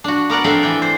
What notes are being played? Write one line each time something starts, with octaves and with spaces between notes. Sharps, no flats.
D4 F#4
B3 A#4 D5 F#5
C4 D4 A4 E5 F5 G5
E3 G5
C5